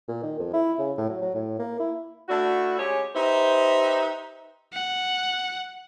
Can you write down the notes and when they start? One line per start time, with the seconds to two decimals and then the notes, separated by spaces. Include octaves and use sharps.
0.08 A#2
0.23 D#3
0.39 F2
0.53 E4
0.79 C#3
0.98 A2
1.09 F#3
1.22 F#3
1.34 A2
1.59 A#3
1.80 E4
2.29 A3 D4 E4 F#4
2.79 G#3 C#4 G4 G#4 C#5
3.15 D#4 G4 B4 C5 E5
4.73 F#5